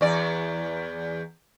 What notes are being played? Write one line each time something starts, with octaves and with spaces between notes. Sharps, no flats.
E2 D5